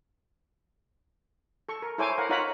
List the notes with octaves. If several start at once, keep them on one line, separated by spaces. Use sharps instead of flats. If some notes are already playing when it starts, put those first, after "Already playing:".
A4 C#6
A#4
E4 A4 C5 C#5 G#5 D6
A#4 F5 F#5
D#4 F4 A#4 C#5 F#5 B5